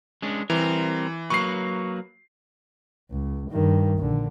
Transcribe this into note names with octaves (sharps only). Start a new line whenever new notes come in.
G#3 C#4 D4
E3 G3 C4 A#4
F#3 A#3 B4 C#6 C7
C#2
G2 D#3
A#1 D3